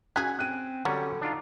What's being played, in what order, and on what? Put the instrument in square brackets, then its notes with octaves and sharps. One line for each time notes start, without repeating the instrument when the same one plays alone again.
[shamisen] C#4 F#4 G#4 [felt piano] F#6 G#6 B6
[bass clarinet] C4 [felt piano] F#6 D#7
[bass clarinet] D3 [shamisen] F#3 [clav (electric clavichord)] G3 C#4
[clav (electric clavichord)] D4 F4 [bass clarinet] D#4